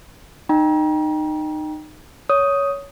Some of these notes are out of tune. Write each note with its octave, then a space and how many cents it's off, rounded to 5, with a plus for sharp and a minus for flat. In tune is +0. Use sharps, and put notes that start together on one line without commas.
D#4 -25 G5 +0 A#5 +35
C#5 +15 D#6 +5